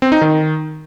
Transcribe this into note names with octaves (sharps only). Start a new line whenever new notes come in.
C4
D#4
D#3